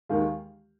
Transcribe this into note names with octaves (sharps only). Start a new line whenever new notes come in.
D#2 D#3 G#3 F5